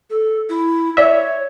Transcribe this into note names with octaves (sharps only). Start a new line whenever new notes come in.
A4
E4
C#5 D5 E5